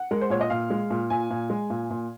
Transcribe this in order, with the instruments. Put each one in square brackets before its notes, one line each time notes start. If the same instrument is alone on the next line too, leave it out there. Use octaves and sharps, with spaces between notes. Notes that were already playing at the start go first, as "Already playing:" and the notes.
Already playing: [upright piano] F#5
G#3 A#4
C5
A#2 C#5
D#5
A#2 F5
G#3
A#2
A#2 G#5
A#2
G#3
A#2
A#2